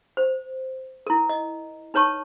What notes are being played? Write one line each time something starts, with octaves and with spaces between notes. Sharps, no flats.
C5
E4 A#4
D#5
D#4 B4 C#5 A5 C#6